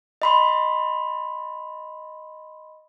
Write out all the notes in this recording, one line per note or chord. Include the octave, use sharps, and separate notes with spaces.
D#5 B5 C6